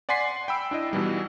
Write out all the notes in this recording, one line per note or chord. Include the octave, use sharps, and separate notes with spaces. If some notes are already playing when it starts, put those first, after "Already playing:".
D5 F#5 G#5 C6 B6 C7
G5 B5 E6 D7
D4 E4 D#5
B2 E3 G3 D#4